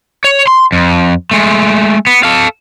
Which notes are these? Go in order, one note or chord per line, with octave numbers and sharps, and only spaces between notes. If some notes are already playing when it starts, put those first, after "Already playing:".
C#5
C6
F2
G#3 A3
B3
A4 F5